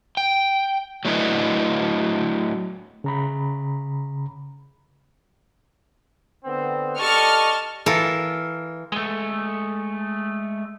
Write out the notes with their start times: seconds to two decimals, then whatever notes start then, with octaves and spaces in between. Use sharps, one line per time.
0.17 G5
1.05 F#3 A3 D4 E4 B4 D#5
3.04 C#3 A#5 B5
6.45 D3 B3 C4
6.99 G4 A4 D5 D#5 A5 C#6 F6
7.86 E3 F4 A4 A#4
8.92 G#3 A3